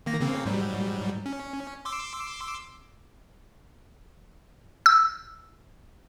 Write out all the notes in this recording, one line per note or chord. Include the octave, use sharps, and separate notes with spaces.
D#3 A#3 A#6
C#3 A#3 C4
G#2 F#3 G3
C#4
C6 D6 E6
E6